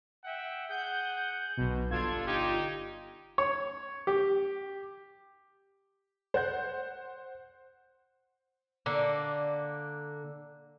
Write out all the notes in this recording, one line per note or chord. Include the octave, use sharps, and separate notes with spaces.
E5 F#5 G5
G#4 F#5 G6
B1 B2
G1 D4 F4 A4 G#6
D#4 G4
C#5
G4
C5 F#5 G6
D3 A#3